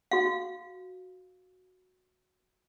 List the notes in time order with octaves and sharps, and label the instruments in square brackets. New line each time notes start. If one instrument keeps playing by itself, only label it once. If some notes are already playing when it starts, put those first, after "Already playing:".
[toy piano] F#4 F5